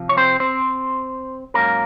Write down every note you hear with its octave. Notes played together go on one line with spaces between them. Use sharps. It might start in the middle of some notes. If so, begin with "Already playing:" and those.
Already playing: C3 F3
C#5
C4 C5
C4 C5
G#2 F#3 A#3 C#4 A#4